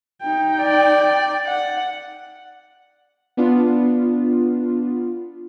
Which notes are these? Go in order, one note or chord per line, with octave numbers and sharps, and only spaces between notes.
D#4 G5
D5
F#5
B3 D4 F4